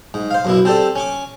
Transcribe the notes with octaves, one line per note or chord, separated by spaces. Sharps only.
G#2
C5 F5
F#2 B2 E4
C4 G4 A4 C5 D5
C#4 C#6 D6